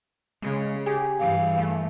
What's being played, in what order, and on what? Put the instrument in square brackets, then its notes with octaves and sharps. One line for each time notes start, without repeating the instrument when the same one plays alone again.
[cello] C#3 [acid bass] G#3
[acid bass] G4 [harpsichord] G#4
[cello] G2 E3 [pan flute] F5
[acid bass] A3